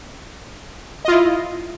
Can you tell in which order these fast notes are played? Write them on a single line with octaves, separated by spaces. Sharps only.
D#5 F4 E4